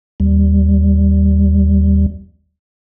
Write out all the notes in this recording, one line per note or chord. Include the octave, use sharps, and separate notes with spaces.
D#2 G3